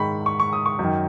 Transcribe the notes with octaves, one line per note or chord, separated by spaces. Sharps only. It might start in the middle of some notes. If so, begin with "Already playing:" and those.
Already playing: G#2 D#3 B5 C#6
C#6
C#6
D#6
C#6
F#2 D#3